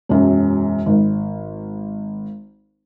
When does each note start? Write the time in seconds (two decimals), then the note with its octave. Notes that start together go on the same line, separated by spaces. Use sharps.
0.09 E1 F#2
0.86 G#1